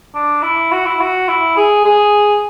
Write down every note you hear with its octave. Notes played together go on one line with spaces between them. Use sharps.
D4
E4
F#4
E4
F#4
E4
G#4
G#4